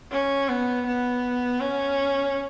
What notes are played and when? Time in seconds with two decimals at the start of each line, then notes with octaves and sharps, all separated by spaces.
0.11 C#4
0.49 B3
0.87 B3
1.61 C#4